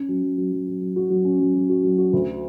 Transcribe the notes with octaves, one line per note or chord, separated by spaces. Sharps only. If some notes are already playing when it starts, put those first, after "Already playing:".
Already playing: C#4
F#3
F#3
F#3
F#3
F#3
F#3
F#4
F#3
C#4
F#3
F#3
F#4
F#3
F#4
D2